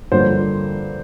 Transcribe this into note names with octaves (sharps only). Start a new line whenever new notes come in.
G2 D3 F3 A#3 C5